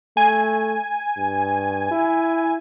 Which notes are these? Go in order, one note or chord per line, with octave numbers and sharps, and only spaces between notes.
A3 G#5
G2
E4